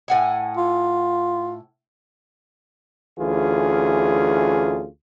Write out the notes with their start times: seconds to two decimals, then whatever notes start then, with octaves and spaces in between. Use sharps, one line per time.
0.08 A2 F#5 G#5
0.57 F4
3.19 D2 E3 C#4 F4 G#4